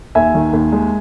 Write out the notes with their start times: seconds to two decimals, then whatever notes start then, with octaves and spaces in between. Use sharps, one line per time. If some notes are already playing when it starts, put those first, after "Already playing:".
0.15 D#2 E5 G#5
0.34 D#3
0.53 D#2
0.72 G#3